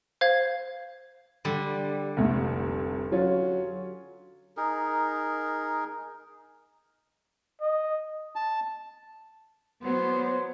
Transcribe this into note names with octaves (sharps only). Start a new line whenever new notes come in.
C5 F5 G#6
D3 G3
F1 C2 A3
F#3 C#4 F4 C#5
D#4 G#4 A#4
D#5
A5
F#3 B3 C5